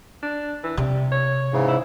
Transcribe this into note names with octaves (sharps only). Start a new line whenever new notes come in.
D4
E3
C3 G3
C#5
G#2 C#3 E3
E4